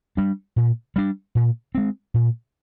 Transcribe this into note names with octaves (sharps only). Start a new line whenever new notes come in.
G3 D4
A#2
G3 D4
A#2
G#3 C4
A#2